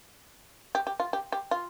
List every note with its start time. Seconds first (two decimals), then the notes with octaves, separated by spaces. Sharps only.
0.75 G4
0.87 G4
1.00 F4
1.13 G4
1.32 G4
1.51 F4